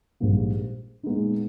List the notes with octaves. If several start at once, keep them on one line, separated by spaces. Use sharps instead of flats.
A#1 G#2 G3 A#3
A#2 G#3 B3 D#4